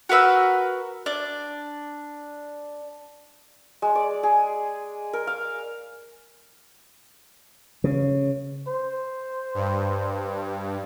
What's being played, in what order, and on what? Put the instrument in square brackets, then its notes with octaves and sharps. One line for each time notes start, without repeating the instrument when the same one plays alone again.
[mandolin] F#4 A#4 B4 E6
D4
[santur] G#3
D5
G#4
A#4
F5
[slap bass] C#3
[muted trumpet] C5
[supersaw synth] G2